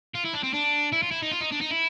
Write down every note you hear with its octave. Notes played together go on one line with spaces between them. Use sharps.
F4
E4
D4
C4
D4
E4
F4
E4
D#4
F4
D#4
D4
D#4
E4